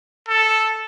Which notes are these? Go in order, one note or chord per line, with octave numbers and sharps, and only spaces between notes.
A4